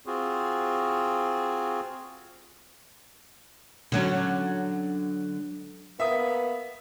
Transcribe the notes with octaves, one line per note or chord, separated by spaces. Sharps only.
C4 F4 F#4 G#4
D3 F#3 C#4
A#3 B3 E5 D#6